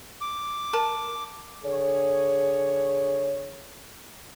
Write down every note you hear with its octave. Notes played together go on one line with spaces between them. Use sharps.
D6
A#4 A5
D3 G#4 C#5